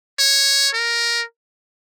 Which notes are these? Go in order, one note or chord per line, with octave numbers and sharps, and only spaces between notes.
C#5
A#4